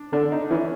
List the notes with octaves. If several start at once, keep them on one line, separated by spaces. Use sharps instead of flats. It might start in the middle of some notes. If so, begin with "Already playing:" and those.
Already playing: D4
D3 D4
D#4
E3 C#4